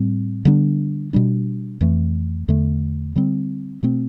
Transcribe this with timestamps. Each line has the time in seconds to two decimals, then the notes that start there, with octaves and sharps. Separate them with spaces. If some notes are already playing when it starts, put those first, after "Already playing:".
Already playing: A2 G3 C4
0.45 D3 G3 B3 D4
1.13 B2 G3 D4
1.81 F2 E3 A3
2.48 E2 D3 A3
3.16 D3 G3 C4
3.83 B2 A3 C4